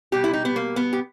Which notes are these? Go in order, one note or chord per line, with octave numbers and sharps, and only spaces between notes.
B2 G3 G4
E4
D#4
B3
A#3
B3
G4